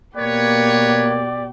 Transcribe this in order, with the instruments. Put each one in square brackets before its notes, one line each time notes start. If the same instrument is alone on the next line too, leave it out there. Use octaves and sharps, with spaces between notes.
[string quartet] B2 G4 [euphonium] A#3 [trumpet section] B4 C#5 [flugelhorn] D5